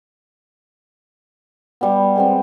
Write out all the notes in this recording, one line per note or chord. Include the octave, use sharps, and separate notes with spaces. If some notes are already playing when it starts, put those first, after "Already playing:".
G3 B3
G#3 B3 C4